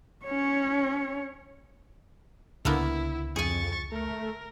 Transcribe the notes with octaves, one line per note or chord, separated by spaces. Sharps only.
C#4 C#5
C#2 D3 A#3 B3 E4
F2 G#4 G#5 C#6 A6
A3 A#4